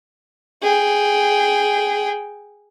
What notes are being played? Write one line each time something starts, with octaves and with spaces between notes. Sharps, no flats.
G#4 G5